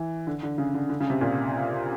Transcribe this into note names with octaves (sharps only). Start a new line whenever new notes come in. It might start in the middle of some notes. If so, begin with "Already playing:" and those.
Already playing: E3
D3
D3
C#3
D3
D3
C#3
C3
A#2